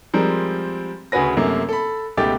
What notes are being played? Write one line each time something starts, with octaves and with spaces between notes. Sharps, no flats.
F3 G3 G#3 C4 A#4
D2 C#3 F#4 G#4 B4 A#6
F#2 C3 A3 A#3
A4 B5
C#2 B2 A3 G4 D6 A6